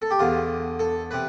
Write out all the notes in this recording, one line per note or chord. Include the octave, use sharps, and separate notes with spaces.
A4
G4
E2 D3 F4
A4
C3 B4